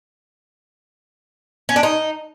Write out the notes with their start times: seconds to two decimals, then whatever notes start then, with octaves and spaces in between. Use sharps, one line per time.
1.69 C#4
1.76 D4
1.83 D#4